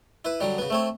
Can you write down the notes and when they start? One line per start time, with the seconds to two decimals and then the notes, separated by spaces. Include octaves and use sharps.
0.25 E4 B4
0.41 D3 F#3 G3
0.58 C#3 B3
0.70 A3 C4 C#5